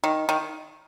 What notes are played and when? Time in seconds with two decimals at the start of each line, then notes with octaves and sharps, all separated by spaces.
0.04 D#3
0.29 D#3